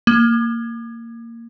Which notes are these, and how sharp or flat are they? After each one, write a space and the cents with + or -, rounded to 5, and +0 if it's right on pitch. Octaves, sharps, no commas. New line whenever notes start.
A#3 -15